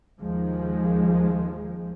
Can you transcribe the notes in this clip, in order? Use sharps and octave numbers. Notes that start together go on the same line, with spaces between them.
D#2 D#3 F3 G#3